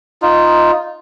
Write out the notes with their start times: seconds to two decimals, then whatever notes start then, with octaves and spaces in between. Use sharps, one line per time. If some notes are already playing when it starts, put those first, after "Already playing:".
0.22 D#4 F4